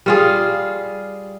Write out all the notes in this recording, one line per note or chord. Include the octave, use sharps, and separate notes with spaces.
G3 F4 G#4